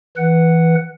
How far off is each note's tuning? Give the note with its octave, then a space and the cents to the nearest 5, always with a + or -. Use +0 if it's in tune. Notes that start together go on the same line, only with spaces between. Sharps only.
E3 +0 B4 -5 F#5 +0